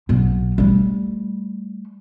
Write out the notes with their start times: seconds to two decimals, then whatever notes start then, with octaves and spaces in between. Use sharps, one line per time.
0.09 B1 B3
0.58 G3 A3